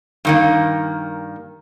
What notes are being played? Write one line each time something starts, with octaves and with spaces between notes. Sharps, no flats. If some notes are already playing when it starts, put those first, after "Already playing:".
G2 D#3 A#3